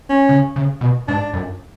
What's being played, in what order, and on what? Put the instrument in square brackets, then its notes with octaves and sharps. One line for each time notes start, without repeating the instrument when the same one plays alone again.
[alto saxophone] C#4
[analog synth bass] C#3
C#3
B2
[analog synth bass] G#2 [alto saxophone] D4
[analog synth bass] F#2